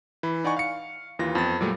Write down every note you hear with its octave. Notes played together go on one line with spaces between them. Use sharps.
E3 B5
D#4 D5 F#5 G#5 C#6
F5 C#7
D#2 E3 F4 A#6
F2 B3 A6
A#2 F#3 G3 A3